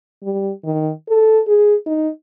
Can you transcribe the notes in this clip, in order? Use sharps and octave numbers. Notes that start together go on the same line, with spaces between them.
G3
D#3
A4
G#4
D#4